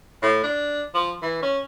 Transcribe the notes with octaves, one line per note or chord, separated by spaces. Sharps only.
A2
D4
F3
E3
C#4